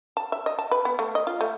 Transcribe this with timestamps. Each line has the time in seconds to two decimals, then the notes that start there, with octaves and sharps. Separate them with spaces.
0.17 A5
0.32 E5
0.46 D#5
0.59 A5
0.71 B4
0.85 B3
0.99 A3
1.15 D#5
1.27 F4
1.41 A3